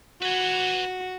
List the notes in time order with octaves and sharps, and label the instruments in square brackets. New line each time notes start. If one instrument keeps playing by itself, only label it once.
[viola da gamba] F#4 [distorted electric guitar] B4 G#5